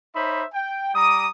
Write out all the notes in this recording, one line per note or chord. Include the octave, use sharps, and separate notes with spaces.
D#4 C5 C#5 E5 B5
G5
G3 A#5 D6 D#6